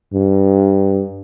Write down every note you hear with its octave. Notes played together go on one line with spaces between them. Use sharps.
G2